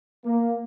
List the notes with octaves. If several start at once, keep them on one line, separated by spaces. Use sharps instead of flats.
A#3